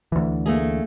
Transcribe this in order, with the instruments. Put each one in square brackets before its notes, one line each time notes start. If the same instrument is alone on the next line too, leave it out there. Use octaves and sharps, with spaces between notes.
[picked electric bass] D2 E3
[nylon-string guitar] A3 A#3 G#4